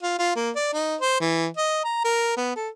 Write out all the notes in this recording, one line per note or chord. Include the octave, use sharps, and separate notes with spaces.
F4
F4
A#3
D5
D#4
C5
E3
D#5
A#5
A#4
B3
A4